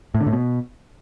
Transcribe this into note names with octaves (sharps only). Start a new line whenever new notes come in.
A2
D3
A2
B2